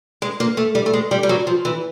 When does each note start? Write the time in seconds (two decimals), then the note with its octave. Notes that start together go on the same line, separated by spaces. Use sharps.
0.22 G#3
0.40 A#3
0.57 A3
0.75 G3
0.86 A3
0.93 G#3
1.11 G3
1.23 G3
1.29 F#3
1.47 F3
1.65 E3